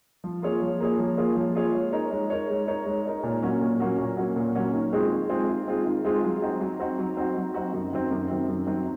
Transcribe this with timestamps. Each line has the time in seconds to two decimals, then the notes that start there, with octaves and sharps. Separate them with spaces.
0.24 F3
0.42 A#3 F4 G#4 C#5
0.62 F3
0.80 A#3 F4 G#4 C#5
0.99 F3
1.17 A#3 F4 G#4 C#5
1.36 F3
1.55 A#3 F4 G#4 C#5
1.74 G#3
1.92 D#4 A#4 C#5
2.11 G#3
2.30 D#4 A#4 C#5
2.49 G#3
2.67 D#4 A#4 C#5
2.86 G#3
3.05 D#4 A#4 C#5
3.23 A#2
3.42 F#3 A#3 C#4 F#4
3.61 A#2
3.80 F#3 A#3 C#4 F#4
3.98 A#2
4.17 F#3 A#3 C#4 F#4
4.36 A#2
4.55 F#3 A#3 C#4 F#4
4.73 D#3
4.93 G#3 C4 F4 G#4
5.11 D#3
5.29 G#3 C4 F4 G#4
5.48 D#3
5.67 G#3 C4 F4 G#4
5.86 D#3
6.05 G#3 C4 F4 G#4
6.24 F#3
6.42 C4 D#4 F#4
6.61 F#3
6.80 C4 D#4 F#4
6.98 F#3
7.17 C4 D#4 F#4
7.36 F#3
7.54 C4 D#4 F#4
7.74 F#2
7.93 D#3 F#3 C4
8.11 F#2
8.30 D#3 F#3 C4
8.48 F#2
8.67 D#3 F#3 C4